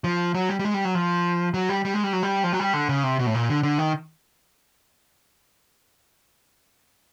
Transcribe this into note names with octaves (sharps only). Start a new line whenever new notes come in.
F3
F#3
G3
G3
G#3
G3
F#3
F3
F#3
G3
G3
G#3
G3
F#3
G3
F3
F#3
G3
D3
C#3
C3
B2
A2
A#2
D3
D3
D#3